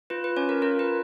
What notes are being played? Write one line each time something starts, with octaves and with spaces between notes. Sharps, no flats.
F4 B4
B4
C#4 C#5
A#4
F4 A#4
B4